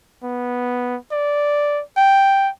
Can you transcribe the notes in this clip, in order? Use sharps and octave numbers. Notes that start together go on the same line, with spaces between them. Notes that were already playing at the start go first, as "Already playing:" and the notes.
B3
D5
G5